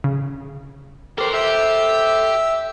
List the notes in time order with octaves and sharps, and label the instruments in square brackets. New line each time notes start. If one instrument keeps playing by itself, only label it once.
[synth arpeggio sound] C#3
[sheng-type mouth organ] G4 [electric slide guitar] A4 C5 [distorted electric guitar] A#4
[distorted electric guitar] G4 [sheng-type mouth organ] E5 E6